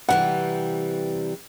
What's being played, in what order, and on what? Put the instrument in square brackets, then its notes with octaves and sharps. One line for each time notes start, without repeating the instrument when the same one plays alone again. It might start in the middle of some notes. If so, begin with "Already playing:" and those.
[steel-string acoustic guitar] C3 E3 G3 [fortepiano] F#5